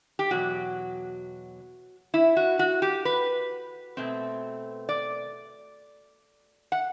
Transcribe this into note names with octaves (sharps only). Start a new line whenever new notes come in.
G4
E2 B2 F#3 F#4
E4
F#4
F#4
G4
B4
B2 A3 C4
D5
F#5